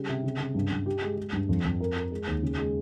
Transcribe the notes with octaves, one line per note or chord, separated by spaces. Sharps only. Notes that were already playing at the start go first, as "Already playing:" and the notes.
Already playing: C#3 G3
C3
C#3
C#3
G2
G2
G4
G#3
G#3
G2
F2
F2
A#4
A#4
G#3
D#2
C#3
G#3